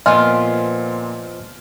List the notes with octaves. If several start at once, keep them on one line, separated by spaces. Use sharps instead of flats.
A#2 F3 B3 C4 F4 D#5 G#5 F6